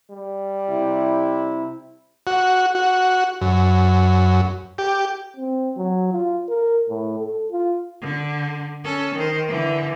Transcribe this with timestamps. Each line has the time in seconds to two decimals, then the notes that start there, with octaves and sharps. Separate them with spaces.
0.10 G3
0.68 C3 E4
2.27 F#4
2.75 F#4
3.41 F#2
4.78 G4
5.37 C4
5.77 F#3
6.12 F4
6.48 A#4
6.89 A2
7.20 A4
7.51 F4
8.01 D3
8.84 C#4 A4
9.15 D#3 C5
9.48 D3 E3